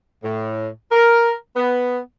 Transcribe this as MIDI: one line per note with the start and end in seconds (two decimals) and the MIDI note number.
0.23 0.67 45
0.91 1.30 70
1.56 1.98 59